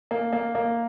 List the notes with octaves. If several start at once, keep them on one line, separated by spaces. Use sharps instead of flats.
A#3
A#3
A#3